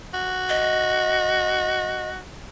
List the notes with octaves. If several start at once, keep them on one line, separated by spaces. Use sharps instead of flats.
F#4
D#5